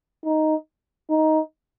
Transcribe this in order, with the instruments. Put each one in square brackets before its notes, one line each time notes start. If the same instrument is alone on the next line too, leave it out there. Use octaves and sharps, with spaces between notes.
[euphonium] D#4
D#4